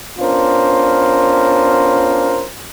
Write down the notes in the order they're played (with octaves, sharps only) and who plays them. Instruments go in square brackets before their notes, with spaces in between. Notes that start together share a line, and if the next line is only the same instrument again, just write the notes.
[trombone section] B3 C#4 D4 F4 A#4 C5